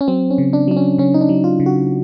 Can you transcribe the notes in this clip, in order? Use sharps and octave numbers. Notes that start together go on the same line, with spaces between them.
C#4
F#3 C4
C#4
C#3
D4
F#3 D4
C#4
C#3 C#4
D#4
D4
F#3
F4
C#3
F#4